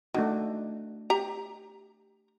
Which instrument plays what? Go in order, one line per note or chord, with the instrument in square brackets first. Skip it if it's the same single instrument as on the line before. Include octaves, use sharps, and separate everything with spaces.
[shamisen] D#3 [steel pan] A3 D4 F#4
[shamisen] G4 A#5